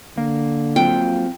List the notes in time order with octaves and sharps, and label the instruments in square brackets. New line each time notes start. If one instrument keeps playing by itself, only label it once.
[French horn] D3 [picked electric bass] A#3
[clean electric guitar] F#3 C4 F4 [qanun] G5